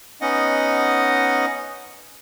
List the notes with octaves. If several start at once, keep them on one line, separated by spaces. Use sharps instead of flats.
B3 C#4 D#4 D#5 F#5